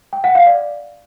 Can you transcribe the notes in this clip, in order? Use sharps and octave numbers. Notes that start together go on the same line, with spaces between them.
G5
F#5
F5
D5